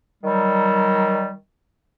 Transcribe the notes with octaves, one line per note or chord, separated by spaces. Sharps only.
D#3 F#3 G3